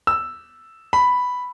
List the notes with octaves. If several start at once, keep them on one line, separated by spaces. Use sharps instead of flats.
E6
B5